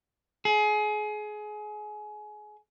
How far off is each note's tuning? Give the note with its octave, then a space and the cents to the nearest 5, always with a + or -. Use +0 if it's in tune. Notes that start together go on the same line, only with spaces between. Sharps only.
G#4 +25